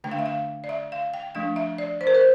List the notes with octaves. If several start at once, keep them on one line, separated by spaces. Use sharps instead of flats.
D3 A3 D4 G5
F5
E5
F5
D5
E5
F5
G5
F3 A3 D4 F5
E5
D5
C5
A#4
C5